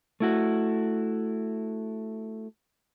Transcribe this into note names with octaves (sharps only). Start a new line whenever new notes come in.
A3 E4 F#4